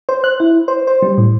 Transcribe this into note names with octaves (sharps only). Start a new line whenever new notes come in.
C5
F#6
E4
C5
C5
G3
A2